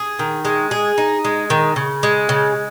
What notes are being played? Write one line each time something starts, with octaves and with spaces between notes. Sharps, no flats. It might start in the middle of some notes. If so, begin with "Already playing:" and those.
Already playing: G#4
D#3
G#3
G#4
D#4
G#3
D#3
C#3
G#3
C#3